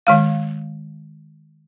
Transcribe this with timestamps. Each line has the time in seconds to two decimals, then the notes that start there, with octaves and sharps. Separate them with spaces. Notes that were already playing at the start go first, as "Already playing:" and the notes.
0.07 D#3 G#3 F5